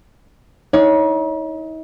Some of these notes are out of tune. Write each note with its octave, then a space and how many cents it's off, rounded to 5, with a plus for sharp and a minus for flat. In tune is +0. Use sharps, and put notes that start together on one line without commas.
D#4 +40 C#5 +20